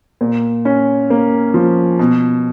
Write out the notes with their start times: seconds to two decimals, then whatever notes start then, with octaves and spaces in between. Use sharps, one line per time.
0.21 A#2
0.65 C#4
1.10 A#3
1.54 F3
1.99 B2